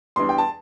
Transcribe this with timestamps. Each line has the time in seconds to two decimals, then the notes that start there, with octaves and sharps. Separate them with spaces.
0.16 E2 E3 G3 D4 C6
0.29 G5
0.38 A5